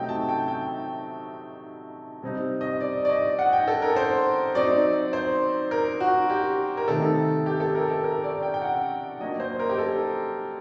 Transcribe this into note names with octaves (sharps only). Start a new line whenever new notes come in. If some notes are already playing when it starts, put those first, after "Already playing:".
Already playing: C3 F#3 A3 D#4 G5
A5
G5
G5
C3 G3 C4 D#4
D#5
D5
D5
D#5
F#5
G5
A4
A#4
C5
F#3 C4 D#4 D5
C5
A#4
F#4
G4
A#4
C3 D#3 A3 D#4 A4
G4
A4
A#4
A4
A#4
D5
G5
G5
F#5
F#3 A#3 D4 D#5
C5
A#4
G4
A4